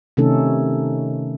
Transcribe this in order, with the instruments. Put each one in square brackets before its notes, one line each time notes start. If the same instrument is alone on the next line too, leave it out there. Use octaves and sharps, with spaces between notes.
[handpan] C3 D#3 A3 C#4 D#4 A4